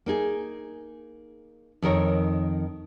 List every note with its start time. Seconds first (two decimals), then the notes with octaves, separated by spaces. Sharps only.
0.06 A#3 D#4 G#4
1.82 F2 D#3 A#4 C#5